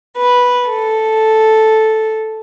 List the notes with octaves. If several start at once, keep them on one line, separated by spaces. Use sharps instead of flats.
B4
A4